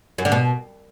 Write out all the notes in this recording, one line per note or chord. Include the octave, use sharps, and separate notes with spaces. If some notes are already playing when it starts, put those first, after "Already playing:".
F#2
D3
B2